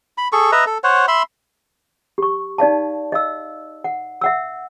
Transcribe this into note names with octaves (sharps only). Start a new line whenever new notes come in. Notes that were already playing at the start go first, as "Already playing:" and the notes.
B5
G#4 A4 C#6
B4 D#5 E5 A#5
A4
C5 C#5 F#5
E5 B5 C6
G4 C#6
D#4 D5 F5 A5
D#5 F5 E6
F#5
E5 F#5 E6